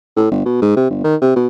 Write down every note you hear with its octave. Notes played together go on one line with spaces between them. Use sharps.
A2
G1
B2
G#2
C3
G1
D#3
C3
B2